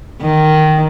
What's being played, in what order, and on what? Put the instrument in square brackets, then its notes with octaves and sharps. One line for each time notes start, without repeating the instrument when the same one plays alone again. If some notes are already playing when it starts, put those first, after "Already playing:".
[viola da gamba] D#3